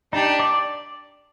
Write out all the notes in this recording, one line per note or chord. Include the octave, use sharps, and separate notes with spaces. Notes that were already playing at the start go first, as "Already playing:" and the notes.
D4 D#4 G4 D5 A5
D5